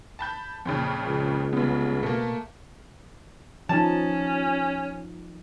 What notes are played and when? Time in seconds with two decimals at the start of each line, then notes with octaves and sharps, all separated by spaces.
0.19 A5 B5 G6
0.65 F2 A#2 C#3
1.06 C#2
1.53 C2 C#3 B3
2.03 B2 A3 A#3
3.69 F3 C#4 D#4 A5